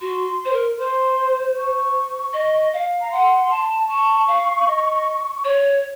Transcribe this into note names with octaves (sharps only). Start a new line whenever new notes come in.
F#4 C6
C5
A#4
C5 C6
C#6
D#5
F5
A#5
F#5 C6
A5
A5 C#6
F5
D#5
C#5